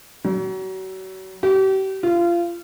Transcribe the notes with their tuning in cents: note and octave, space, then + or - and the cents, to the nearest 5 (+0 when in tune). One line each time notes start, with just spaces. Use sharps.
F#3 +35
G4 -35
F4 -25